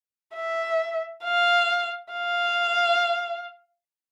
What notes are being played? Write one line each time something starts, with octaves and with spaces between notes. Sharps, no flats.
E5
F5
F5